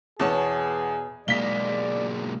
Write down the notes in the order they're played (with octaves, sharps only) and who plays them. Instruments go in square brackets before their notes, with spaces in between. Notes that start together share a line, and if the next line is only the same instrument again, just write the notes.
[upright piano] E2 B3 [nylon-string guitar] B2 C#5 A5 [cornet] G#4
[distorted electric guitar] B1 G#3 [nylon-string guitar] A#3 [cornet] D5 [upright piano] B6 G7